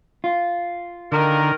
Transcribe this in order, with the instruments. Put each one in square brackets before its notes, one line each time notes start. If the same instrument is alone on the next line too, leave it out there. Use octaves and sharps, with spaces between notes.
[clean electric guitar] F4
[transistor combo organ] D3 [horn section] D#3 A#4